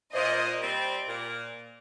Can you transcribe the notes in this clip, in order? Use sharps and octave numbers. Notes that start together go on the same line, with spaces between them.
A#2 C5 D#5
G3 C4
A#2